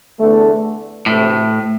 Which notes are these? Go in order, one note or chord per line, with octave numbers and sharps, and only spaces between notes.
E2 D3 A3
D2 A2 C3 E3 A3